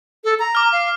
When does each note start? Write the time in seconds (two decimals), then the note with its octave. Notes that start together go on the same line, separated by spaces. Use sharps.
0.24 A4
0.39 A#5
0.55 D6 F6
0.72 F5